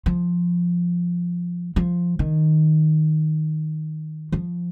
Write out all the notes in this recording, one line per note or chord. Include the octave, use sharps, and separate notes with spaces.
F3
F3
D#3
F3